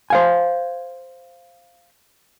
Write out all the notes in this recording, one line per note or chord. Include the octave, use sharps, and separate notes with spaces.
C5 F5 G#5